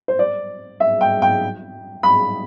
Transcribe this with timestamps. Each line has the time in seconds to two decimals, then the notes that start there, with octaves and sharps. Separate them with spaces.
0.08 C5
0.19 D5
0.80 E5
1.01 G5
1.22 G5
2.03 B5